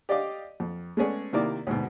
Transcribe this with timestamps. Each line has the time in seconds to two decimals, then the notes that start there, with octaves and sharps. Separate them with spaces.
0.09 G4 D5 D#5 F5 D6
0.60 F2
0.97 G#3 A3 B3 C#4 G#4 D5
1.33 C3 D#3 A#3 E4 D5 D6
1.67 D2 G#2 B2